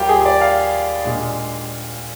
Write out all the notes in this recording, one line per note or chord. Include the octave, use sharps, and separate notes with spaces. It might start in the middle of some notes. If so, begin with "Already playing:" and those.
Already playing: D#2 D#3 G3 A#3 F4 G4
G#4
D5
F5
A#2 G#3 D4